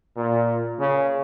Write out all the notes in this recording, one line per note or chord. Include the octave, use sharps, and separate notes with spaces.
A#2
C#3